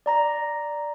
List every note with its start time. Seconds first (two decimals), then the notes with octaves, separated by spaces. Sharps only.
0.06 D5 A#5 A#6